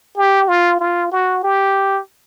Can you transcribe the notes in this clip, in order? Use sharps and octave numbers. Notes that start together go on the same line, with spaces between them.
G4
F4
F4
F#4
G4